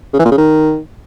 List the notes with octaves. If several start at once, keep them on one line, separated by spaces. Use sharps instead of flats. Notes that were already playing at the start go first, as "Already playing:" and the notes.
C#3
E3
A#2
C#3
D#3